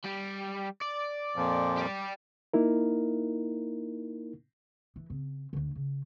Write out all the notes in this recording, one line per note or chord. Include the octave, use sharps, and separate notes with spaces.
G3 G4
D5
F2 A#2 F3
G4 D5
A#3 D#4 E4 A#4
E3
C#3 C4
D2 D3
C#3